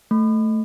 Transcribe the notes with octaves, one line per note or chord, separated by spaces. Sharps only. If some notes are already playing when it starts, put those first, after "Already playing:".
A3